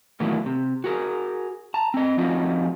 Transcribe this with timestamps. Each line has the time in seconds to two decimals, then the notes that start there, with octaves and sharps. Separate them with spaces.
0.20 A2 D#3 E3 F#3 A#3 B3
0.46 C3
0.84 F#4 G#4 A#4
1.74 A5 A#5
1.94 C4 D#5
2.18 F3 C4 C#4 D#4 F4 F#4